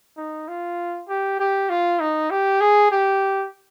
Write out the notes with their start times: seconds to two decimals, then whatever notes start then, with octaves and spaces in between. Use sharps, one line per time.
0.17 D#4
0.48 F4
1.09 G4
1.39 G4
1.69 F4
2.00 D#4
2.30 G4
2.60 G#4
2.91 G4